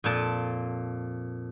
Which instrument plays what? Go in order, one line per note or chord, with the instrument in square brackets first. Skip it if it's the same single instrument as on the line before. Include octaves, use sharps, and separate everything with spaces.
[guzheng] F2 A#2 A5